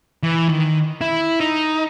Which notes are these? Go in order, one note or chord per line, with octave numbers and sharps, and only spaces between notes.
E3
D#3
E4
D#4